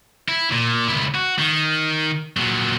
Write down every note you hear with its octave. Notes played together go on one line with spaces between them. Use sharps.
E4
A#2
C#2 E4
F#4
D#3
A#2 F#3